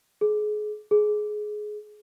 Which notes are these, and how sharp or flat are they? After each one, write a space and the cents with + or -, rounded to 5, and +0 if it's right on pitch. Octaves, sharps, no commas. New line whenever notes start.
G#4 +30
G#4 +20